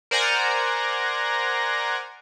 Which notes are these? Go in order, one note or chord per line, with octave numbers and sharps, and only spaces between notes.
A#4 C5 D5 F#5 G#5 A#5